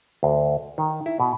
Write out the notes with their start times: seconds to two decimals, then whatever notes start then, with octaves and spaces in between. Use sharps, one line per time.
0.23 D2
0.78 D#3
1.06 E4
1.20 B2